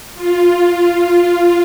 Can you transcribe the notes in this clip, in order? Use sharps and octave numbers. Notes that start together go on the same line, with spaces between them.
F4